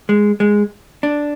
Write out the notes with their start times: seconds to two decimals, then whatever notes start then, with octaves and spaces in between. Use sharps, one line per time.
0.09 G#3
0.40 G#3
1.03 D4